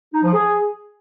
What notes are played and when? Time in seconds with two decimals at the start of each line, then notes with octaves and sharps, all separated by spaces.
0.13 D#4
0.23 F3
0.33 G#4